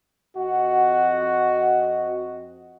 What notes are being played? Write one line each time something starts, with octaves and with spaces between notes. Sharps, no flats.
F2 C4 F#4 D#5 F#5